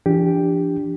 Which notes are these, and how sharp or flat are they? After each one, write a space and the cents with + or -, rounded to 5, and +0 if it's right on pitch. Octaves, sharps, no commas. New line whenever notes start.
E3 +40 D4 -5 G4 +0